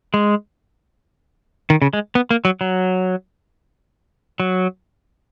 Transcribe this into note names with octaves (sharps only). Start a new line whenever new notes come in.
G#3
D#3
C#3
G#3
B3
A#3
F#3
F#3
F#3